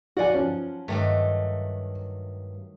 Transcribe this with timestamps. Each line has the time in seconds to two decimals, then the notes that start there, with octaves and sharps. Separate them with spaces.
0.17 F#3 F#4 D5 F#5 G#5
0.34 F3 C#4
0.88 G2 D#3 F#3 A3